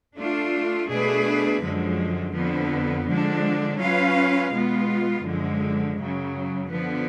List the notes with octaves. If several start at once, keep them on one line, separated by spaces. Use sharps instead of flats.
A3 D4 F4
B2 A3 D4 G#4 B4
F#2 D3 F3 G#3
F2 D3 F3 B3
D3 F3 G#3 D4
F#3 C#4 F4 B4 F5
B2 G#3 B3 F4
F#2 D3 F3 G#3
F#2 C#3 F#3
D3 F3 B3